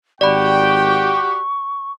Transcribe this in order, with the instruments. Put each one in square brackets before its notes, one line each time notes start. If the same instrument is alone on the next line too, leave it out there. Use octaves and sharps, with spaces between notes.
[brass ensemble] G#1 G5 [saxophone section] F#4 G4 [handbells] D5 B5 [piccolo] C#6